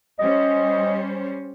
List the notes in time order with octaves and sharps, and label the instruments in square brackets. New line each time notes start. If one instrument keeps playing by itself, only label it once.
[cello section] G3 C#4 C5 [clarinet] D#5